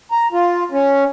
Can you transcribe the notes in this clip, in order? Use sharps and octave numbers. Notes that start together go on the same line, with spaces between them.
A#5
F4
C#4